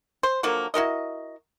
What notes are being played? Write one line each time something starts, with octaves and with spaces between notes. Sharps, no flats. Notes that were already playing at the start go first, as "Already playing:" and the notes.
C5
D3 F3 F#3 A#3
E4 F#4 A#4 D#5